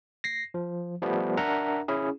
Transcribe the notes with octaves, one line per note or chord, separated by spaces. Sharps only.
A#6 C7
F3
F3 G3 A3 B3
D4 A#4 E5 F#5 A#5
C#4 E4 G#4